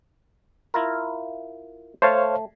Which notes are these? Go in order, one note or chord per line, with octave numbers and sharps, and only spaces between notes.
E4 F4 A#4
A3 C5 C#5 F5 A5